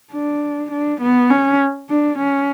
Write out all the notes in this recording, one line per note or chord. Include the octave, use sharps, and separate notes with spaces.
D4
D4
B3
C#4
D4
C#4